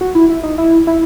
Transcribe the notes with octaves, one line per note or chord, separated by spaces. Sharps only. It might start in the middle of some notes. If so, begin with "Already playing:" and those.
F#4
E4
E4
D#4
E4
E4